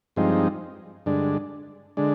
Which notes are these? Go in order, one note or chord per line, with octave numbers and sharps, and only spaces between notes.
G2 F3 G#3 C4 D#4
G2 D3 G#3 D4
D3 G#3 D4